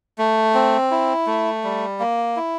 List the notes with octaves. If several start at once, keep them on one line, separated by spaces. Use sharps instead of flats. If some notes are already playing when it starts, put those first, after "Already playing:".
A3
C4
E4
A3
G3
A#3
E4